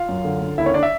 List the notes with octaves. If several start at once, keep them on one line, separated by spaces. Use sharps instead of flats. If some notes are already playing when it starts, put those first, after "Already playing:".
Already playing: F4 F5
F#2
D3
D3
D#2 E4 E5
C#4 C#5
D4 D5
E5